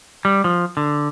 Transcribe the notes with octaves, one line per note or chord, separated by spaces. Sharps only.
G3
F3
D3